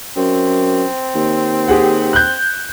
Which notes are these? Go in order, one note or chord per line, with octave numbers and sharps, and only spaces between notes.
F#2 C4
D#2
G4 G#4 F#5
F#6 G6